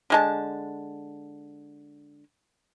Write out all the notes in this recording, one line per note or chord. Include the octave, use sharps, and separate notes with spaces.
D3 G#3 A5